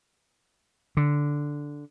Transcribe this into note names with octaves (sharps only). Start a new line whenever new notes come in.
D3